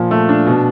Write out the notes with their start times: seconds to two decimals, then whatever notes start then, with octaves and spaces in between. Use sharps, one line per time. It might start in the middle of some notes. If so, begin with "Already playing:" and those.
Already playing: A#2 F3
0.11 A3
0.29 D4
0.46 B2